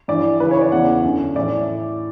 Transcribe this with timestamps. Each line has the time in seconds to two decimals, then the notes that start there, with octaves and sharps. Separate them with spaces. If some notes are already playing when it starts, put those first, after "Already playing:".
0.08 G2 E3 D5
0.40 F#2 C#3 E3 B4
0.51 C#5
0.61 D5
0.72 E2 C#3 E3 F#5
1.04 F#2 D3
1.35 A2 E3 D5